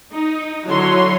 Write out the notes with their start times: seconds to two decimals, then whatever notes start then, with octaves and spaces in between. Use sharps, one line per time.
0.13 D#4
0.67 D3 F#3 E4 C#5 C6